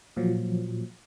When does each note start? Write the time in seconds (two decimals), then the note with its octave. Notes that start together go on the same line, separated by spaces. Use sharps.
0.16 A#2 F3 F#3